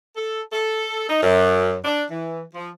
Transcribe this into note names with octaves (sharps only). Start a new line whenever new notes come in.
A4
A4
D#4
F#2
D4
E3
F3